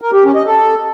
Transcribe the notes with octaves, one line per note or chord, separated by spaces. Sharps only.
A#4
G4
C#4
D#5
A4